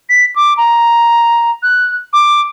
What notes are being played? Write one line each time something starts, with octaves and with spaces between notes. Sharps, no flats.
B6
D6
A#5
F#6
D6